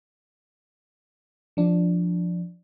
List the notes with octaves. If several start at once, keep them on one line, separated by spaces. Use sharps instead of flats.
F3 D4